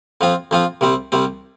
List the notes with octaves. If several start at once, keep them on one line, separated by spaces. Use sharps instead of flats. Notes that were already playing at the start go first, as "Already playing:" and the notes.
F2 F3 C4 F4
F2 F3 C4 F4
C2 C3 G3 C4
C2 C3 G3 C4